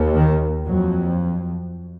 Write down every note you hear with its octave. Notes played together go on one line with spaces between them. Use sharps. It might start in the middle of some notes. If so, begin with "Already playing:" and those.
Already playing: D#2
D#3
F2 F#3